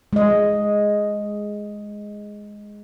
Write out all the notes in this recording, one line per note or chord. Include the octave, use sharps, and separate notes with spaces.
G#3 D#5